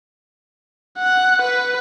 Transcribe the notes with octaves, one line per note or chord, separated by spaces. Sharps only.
F#5
B4